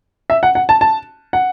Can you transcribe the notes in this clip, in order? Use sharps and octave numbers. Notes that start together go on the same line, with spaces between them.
E5
F#5
F#5
A5
A5
F#5